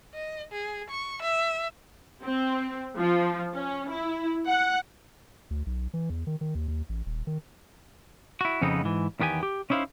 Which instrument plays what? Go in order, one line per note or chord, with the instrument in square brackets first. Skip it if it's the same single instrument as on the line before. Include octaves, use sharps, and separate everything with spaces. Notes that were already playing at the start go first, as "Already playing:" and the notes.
[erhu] D#5
G#4
C#6
E5
[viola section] C4
F3
C#4
E4
F#5
[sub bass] D2
B1
E3
E2
D#3
D#3
D#2
D#2
A1
D#1
D#3
[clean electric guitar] E4 F#4
F2 C#3 B3 C4 D#4
G#2 E3
E2 D#3 B3 G4 G#5
G4
C#4 D#4 E4 C5 F5